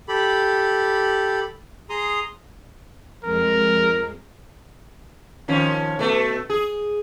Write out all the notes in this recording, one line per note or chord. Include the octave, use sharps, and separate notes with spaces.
G4 A4 B5
G#4 A#5 C6 D#6
F2 G#3 A#4
D#3 F3 C#4
B2 A3
G#4